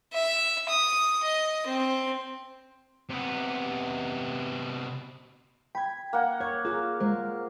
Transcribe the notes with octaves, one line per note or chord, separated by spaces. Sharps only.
E5
D#6
D#5
C4
C3 B3
G5 B5 G#6
A#3 F#5
C#5 G#6
F4 G#4 A#4
G#3 A#4 C5